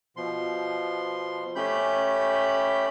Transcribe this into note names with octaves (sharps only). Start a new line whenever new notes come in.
B2 F3 C6
A3 C#4 G4 B5 G6